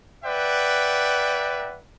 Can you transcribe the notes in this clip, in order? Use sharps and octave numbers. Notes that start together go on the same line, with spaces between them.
B4 D5 E5 F#5 G5